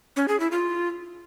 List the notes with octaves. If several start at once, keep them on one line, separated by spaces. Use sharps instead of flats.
C#4
G#4
E4
F4